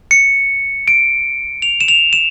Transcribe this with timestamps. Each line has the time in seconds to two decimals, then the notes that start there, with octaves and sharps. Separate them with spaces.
0.11 C#7
0.88 D7
1.62 F7
1.81 E7
1.88 F7
2.13 E7